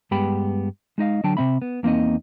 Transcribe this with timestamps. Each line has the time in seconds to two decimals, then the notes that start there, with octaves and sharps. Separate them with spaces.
0.11 G2 G#3 B3 G4 G5 B5
0.98 G#3 D#4 D#5 F5
1.24 D3 F#3 D4 G5 A5
1.37 C3 F#3 C4 E5 B5
1.62 B3
1.83 E2 A#3 C4 D#4 D#5